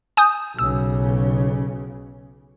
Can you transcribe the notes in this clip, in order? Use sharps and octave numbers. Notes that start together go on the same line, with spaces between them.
G#5 D#6 G6
B1 C#3 E6